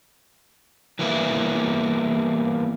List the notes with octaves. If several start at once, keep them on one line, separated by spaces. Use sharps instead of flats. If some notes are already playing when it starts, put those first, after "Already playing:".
E3 G3 A#3 B3 E4